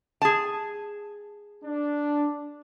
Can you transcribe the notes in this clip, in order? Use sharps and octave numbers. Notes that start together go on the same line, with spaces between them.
G#4 A5
D4